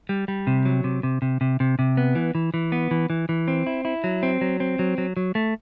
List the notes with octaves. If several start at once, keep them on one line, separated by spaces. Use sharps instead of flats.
G3
G3
C3
F#3
C3
C3
C3
C3
C3
C3
B3
E3
E3
E3
B3
E3
E3
E3
C4
E4
E4
F#3
C4
F#3
C4
F#3
F#3
F#3
A3